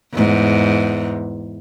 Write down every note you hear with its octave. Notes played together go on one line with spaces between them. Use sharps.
E2 G#2